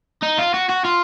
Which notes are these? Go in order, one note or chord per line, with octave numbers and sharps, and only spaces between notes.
D#4
F4
F#4
F#4
F4